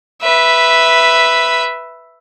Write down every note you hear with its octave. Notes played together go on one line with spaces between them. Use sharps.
B4 E5